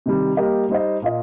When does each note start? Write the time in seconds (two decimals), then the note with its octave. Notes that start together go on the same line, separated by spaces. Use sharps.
0.06 C3 D#3 G3
0.37 G3 A#3 G4 A#4 D#5
0.70 G3 D#4 C5 D#5
1.02 A#2 A#3 F4 D#5